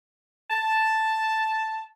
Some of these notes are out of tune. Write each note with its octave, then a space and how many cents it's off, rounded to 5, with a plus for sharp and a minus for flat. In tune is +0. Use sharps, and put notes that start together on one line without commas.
A5 +0